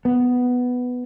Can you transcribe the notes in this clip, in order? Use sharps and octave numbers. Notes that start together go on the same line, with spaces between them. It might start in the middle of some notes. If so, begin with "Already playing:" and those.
B3